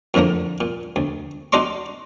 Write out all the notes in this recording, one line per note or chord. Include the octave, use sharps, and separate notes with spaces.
F2 A2 D3 A3 A#3
A#2
D2
D#4 F#4 A4 D5 C6 C#6